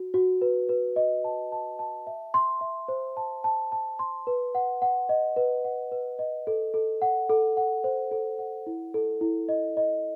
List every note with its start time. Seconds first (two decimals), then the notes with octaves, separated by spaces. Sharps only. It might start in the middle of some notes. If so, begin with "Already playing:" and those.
Already playing: F#4
0.14 F#4
0.42 B4
0.69 B4
0.96 D#5
1.24 A5
1.52 A5
1.79 A5
2.07 E5
2.34 C6
2.61 E5
2.88 C5
3.17 A5
3.44 A5
3.72 A5
3.99 C6
4.27 B4
4.55 F#5
4.82 F#5
5.09 D#5
5.37 B4
5.65 F#5
5.92 B4
6.19 D#5
6.47 A4
6.74 A4
7.02 F#5
7.29 A4
7.57 F#5
7.84 C5
8.11 A4
8.39 F#5
8.67 E4
8.94 A4
9.21 E4
9.49 D#5
9.77 D#5